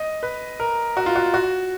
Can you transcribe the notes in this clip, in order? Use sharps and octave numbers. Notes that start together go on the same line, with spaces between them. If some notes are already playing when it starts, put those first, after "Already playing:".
Already playing: D#5
B4
A#4
F#4
F4
F#4
F#4